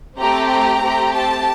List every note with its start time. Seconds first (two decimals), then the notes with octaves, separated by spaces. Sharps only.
0.19 A3 C4 G4 A#5
0.50 A#5
0.81 A3 C4 G4
1.13 A5